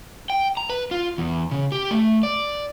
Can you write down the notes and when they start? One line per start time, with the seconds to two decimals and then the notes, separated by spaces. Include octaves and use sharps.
0.30 G5
0.57 A#5
0.70 B4
0.91 F4
1.18 E2
1.51 C#3
1.72 G4
1.91 A3
2.23 D5